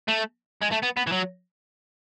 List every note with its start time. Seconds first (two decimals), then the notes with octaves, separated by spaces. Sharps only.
0.08 A3
0.63 G#3
0.72 A3
0.83 B3
0.97 B3
1.07 E3
1.12 F#3